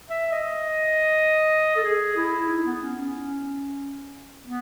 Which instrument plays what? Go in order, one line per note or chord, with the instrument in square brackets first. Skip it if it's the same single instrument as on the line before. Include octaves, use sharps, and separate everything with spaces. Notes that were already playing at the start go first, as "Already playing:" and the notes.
[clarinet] E5
D#5
A4
G#4
E4
D#4
B3
C#4
C#4
B3